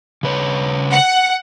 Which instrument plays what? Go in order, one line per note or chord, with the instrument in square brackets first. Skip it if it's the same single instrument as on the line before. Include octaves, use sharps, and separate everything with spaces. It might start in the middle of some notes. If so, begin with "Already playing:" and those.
[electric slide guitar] C#3 B4 C#5
[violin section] F#5